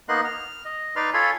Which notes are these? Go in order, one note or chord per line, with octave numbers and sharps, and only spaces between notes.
A#3 B3 D#4 D#5 C6 F#6
F6
D#5
D#4 B4 D5 C6 F6
F4 A4 C#5 G#5 B5 C6